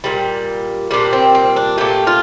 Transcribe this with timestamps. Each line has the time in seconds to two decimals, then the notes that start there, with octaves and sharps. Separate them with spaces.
0.04 A#2 G3
0.91 A#2 G3 D4
1.13 C4
1.35 C4
1.56 D4
1.78 A#2 A3 G4
2.07 F4